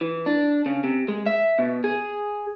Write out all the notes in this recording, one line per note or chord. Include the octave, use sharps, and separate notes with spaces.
E3
D4
C#3
C3
G#3
E5
B2
G#4